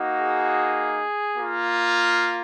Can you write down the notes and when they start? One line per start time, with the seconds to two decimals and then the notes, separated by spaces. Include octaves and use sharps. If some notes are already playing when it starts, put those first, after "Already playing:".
Already playing: A#3 D#4 F#4
0.20 G#4
1.38 A#3 F4